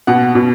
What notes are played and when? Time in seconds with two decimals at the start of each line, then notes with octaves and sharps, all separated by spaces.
0.07 B2 F#5
0.35 B2